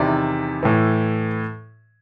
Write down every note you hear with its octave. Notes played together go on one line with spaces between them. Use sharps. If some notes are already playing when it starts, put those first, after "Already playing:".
Already playing: E2 C3 D#3 D5 E5
A2 E3